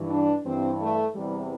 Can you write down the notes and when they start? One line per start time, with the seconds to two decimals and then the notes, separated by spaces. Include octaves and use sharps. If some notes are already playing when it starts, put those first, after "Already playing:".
Already playing: G2 E3
0.09 D4
0.44 G2 E3 C4
0.80 A3
1.15 E2 C3 E3 G3